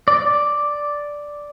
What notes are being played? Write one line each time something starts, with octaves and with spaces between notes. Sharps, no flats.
D5